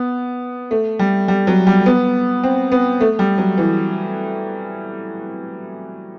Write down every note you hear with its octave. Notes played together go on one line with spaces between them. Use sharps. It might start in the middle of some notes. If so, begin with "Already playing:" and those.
Already playing: B3
A3
G3
G3
F#3
G3
B3
C4
B3
A3
G3
F#3
E3